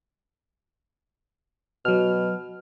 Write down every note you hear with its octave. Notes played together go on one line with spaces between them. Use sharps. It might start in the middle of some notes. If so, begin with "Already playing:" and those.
B2 F#3 F6